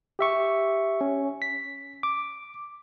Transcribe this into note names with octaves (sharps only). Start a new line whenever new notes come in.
G4 E5 C#6
C#4
B6
D6